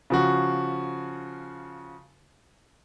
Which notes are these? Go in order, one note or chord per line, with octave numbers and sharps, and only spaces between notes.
C#3 F3 F#4